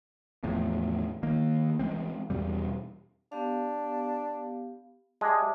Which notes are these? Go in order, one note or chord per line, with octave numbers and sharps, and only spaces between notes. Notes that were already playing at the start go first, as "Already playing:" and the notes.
E2 A2 F3
D#3 A#3
E3 F#3 G#3 C4
E2 B2 G3
B3 D4 G4 F5
G3 G#3 G4 E5 A5 D6